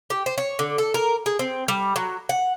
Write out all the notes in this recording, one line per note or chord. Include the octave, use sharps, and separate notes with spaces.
G4
C5
C#5
D3
A4
A#4
G#4
C4
G3
F#3
F#5